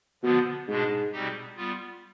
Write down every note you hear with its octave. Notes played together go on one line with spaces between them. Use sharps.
B2 D3 F3 B3
G#2 B2 G#3 D4
B2 G3 C4 D#4 G4
G3 B3 F4